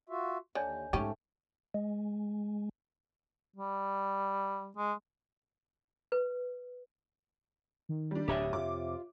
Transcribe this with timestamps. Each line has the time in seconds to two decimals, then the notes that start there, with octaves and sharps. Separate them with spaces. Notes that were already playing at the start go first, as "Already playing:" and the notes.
0.09 F4 F#4 E5
0.55 D#2 D3 C#5 G#5 G6
0.93 G#2 A3 C#4 G4
1.74 G#3
3.56 G3
4.77 G#3
6.12 B4
7.89 D#3
8.11 G3 D4
8.28 D1 G4 C#5 E5 D#6
8.53 F2 C3 F4 D6